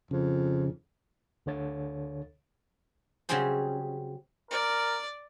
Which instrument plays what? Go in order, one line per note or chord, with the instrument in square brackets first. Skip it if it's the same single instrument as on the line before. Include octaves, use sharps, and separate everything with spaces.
[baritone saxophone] F2 [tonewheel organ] C#3
[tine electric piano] D2 D3 C#5 A6
[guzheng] C#3 F#3 G3 C4 G#4 C5
[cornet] A#4 [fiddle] D5